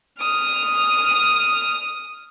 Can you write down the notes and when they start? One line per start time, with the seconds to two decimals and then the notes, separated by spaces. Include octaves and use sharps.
0.21 D#6 F6